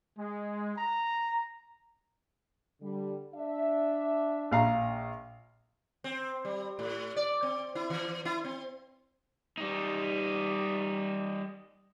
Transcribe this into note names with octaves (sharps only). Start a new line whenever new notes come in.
G#3
A#5
D3 G3
D4 E5
A#1 F5 A#5
C4
G3
A2
D5
C4
E4
E3
E4
C4
G3 D#4